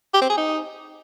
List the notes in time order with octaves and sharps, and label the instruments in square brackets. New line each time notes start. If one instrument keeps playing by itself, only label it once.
[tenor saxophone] G4
C4
G#4
D#4